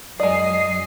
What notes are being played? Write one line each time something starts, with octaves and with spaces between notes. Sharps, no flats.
F#2 F#3 G#3 D5 D#5 C7